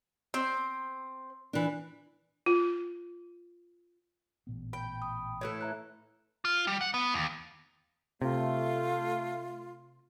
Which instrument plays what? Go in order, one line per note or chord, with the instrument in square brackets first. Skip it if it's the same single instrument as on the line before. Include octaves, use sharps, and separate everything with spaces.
[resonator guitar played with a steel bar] C4 C5
[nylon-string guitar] E3 D4
[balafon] F4
[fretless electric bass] A1 A#2 B3
[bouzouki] G5 [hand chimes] B5
[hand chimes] B5 D#6
[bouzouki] A2 E3 A4
[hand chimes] E5 A#5 F#6
[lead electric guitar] F4
G3
F#5
B3
D#2
[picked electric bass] C3 [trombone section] A3 [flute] F4